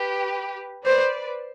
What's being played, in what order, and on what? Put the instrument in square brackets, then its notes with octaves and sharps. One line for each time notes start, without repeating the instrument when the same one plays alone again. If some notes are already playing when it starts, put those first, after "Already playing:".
Already playing: [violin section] G4 B4
[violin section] B4 D5 [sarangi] C5